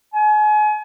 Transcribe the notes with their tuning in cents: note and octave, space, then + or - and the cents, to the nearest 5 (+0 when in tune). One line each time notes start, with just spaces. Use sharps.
G#5 +35